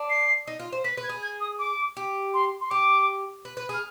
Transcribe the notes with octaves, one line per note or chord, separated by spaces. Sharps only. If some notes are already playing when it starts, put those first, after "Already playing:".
Already playing: D4
C7
D#4
F4
C5
B4 B6
B4
G#6
G#4
G#6
D#6
D6
G4
C6
C6
G4 D6
B4
B4
G#4
F6